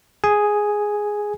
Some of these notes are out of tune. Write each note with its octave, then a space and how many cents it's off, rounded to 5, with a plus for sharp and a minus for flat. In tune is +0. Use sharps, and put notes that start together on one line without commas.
G#4 +0 G#5 +0